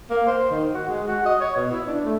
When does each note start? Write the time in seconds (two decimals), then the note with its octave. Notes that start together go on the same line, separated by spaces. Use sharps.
0.10 A#3
0.26 C5
0.51 D#3
0.74 F#4
0.88 G#3
1.08 F#4
1.26 D#5
1.40 C#5
1.56 B2
1.71 E4
1.87 D4
2.04 A3